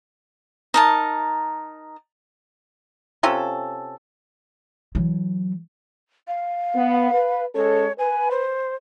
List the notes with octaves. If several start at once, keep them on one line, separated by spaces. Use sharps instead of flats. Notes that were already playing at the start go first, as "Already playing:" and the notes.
D#4 A#4 A5
C3 C#4 F4 A4
E3 F#3
F5
B3
B4
G#3 C#4 A4 C#5
B4 G#5
C5